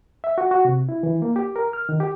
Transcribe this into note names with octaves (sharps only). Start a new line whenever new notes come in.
E5
F#4
F#4
C3
E4
E3
A#3
G4
A#4
F6
D#3
G4